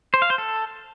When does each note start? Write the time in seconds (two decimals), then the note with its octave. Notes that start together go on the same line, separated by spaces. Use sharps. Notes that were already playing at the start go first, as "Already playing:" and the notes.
0.14 C5
0.22 F5
0.30 C5
0.38 A4